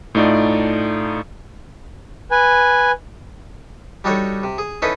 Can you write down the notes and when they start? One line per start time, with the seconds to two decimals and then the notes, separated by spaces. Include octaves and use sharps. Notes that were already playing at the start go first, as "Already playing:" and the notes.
0.15 A2 A3 D#4 F4 D5
2.31 B4 G#5
4.04 G3 D4 D#4 F#4 A4 C#5
4.43 C3
4.58 G#4
4.82 C#4 D#4 E4 A4 B4 D#5